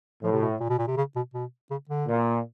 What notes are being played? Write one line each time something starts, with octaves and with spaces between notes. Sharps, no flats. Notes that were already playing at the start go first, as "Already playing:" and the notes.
A2 F3
C3
B2
A#2
B2
A#2
C3
C#3
B2
B2
C#3
D3
A#2